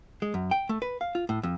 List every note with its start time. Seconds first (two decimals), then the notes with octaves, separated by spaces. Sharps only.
0.22 G#3
0.34 F#2
0.51 G5
0.69 A3
0.82 B4
1.01 F5
1.15 F4
1.29 A2
1.43 F2